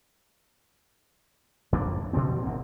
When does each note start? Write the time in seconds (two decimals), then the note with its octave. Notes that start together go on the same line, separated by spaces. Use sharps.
1.72 F2 A#3 D4
2.13 B2 D3 F3 C4
2.43 G#1 D2 A#3 C4